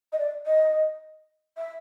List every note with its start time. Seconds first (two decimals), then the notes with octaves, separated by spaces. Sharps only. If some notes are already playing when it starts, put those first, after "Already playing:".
0.12 D#5
0.19 D5
0.46 D#5
1.57 E5